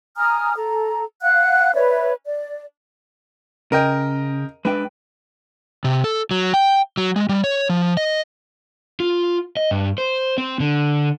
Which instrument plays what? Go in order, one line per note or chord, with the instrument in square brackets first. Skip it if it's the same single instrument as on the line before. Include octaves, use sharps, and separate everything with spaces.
[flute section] G#5 A#5 D#6 F6
A4 A#5
F5 F#5 F#6
B4 C#5 D5 E5
D5
[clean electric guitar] C#3 [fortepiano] A#4 D#5 G5
[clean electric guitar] G#3 D4 G5 [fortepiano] B4
[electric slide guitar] C3
A4
F#3
G5
F#3
G#3
G3
C#5
F3
D#5
F4
D#5
G2
C5
C4
D3